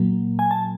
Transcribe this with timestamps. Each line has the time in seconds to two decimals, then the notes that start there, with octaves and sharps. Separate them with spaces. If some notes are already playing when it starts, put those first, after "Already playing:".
Already playing: A#2 F#3 A#3
0.39 G#5
0.51 A5